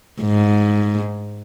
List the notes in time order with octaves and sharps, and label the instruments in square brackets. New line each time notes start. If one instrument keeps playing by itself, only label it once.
[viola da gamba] G#2